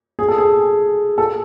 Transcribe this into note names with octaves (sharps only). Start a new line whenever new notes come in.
G#4
A4
G#4
A4